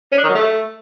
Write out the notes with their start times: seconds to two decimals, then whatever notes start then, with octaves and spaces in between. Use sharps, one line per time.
0.12 C#4
0.18 D4
0.23 D#3
0.29 F#3
0.35 A3